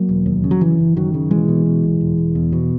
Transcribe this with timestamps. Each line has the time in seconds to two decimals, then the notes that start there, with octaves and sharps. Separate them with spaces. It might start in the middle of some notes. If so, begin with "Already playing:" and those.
Already playing: F#3 A#3
0.09 E1
0.26 D#2
0.44 C#3
0.51 F#3
0.61 F#1 E3
0.79 F#1
0.96 F#2 D#3 F#3
1.14 C#3
1.31 B1 E3 G#3
1.48 B2
1.66 B2
1.84 B1
2.01 E1
2.18 E1
2.35 E2
2.52 B2